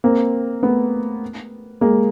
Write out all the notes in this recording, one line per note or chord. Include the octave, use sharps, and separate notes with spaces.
A#3 C4
A3 B3
G#3 A#3